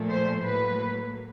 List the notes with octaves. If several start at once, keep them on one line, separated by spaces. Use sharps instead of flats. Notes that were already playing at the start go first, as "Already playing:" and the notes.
Already playing: A#2 F3 A3
C5
A2 F#3 A#3 B4